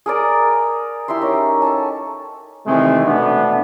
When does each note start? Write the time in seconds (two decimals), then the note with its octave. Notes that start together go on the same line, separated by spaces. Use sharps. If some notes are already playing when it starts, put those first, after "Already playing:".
0.06 G#4 A#4 D5 A#5
1.08 E4 G4 E5 C6
1.21 C#4 D#4 A#4
1.62 A4 G#5 A5
2.66 C3 D#3 E3 G#3 A3 C4
3.06 B2 A3 B3 D4